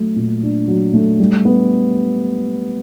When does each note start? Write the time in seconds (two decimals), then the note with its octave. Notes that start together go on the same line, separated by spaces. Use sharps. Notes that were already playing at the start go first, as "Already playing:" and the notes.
Already playing: F#3 A3
0.16 A#2
0.43 D4
0.68 F#3
0.94 A3
1.20 G3
1.45 B3